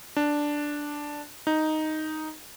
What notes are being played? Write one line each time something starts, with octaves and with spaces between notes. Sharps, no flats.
D4
D#4